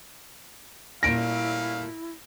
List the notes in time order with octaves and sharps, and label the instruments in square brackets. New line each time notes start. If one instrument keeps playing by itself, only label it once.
[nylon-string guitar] A#2 G3 [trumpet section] A3 C#4 F5 [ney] E4 [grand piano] A#6 D7